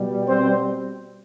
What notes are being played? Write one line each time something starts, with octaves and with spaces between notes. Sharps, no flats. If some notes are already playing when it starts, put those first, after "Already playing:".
Already playing: B2 G3
C4 C5